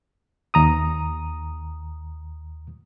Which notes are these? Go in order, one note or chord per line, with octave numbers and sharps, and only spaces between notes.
D#2 A#5 D#6